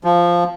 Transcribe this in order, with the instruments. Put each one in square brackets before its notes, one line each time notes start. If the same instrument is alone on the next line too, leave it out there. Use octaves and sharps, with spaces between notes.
[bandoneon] F3